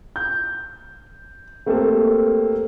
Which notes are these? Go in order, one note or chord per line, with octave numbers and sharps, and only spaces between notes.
G6
A3 A#3 C4 G4 A4